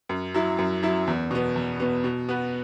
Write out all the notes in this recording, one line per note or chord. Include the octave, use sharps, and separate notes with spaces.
F#2
F#3 E4
F#2
F#3 E4
E2
B2 B3
E2
B2 B3
B2
B3 F#4 B4